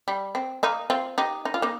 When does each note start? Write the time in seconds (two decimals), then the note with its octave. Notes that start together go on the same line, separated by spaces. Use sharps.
0.08 G3
0.35 C4
0.63 A#3 D#4
0.90 C4 F4
1.18 D#4 G4
1.45 D#4
1.54 F4
1.62 A#3 D#4